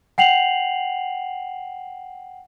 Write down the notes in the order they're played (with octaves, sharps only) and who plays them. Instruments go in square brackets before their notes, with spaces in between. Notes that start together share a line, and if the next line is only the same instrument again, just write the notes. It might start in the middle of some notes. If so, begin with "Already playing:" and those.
[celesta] F#5 G5 C7 F7 F#7